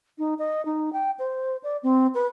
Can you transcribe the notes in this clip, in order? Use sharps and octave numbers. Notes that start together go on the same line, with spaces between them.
D#4
D#5
D#4
G5
C5
D5
C4
B4